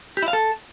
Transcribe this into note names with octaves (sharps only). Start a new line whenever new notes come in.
G4
E4
F5
A4